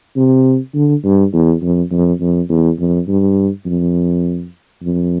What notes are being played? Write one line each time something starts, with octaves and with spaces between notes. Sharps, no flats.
C3
D3
G2
E2
F2
F2
F2
E2
F2
G2
F2
F2